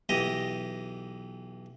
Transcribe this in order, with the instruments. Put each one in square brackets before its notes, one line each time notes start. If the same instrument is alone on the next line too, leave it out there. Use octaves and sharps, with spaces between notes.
[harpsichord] B1 E3 G4 D#5 D#6